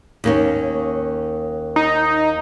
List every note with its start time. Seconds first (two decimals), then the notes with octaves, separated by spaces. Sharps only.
0.24 D#2 A#3 C#4
1.76 D#4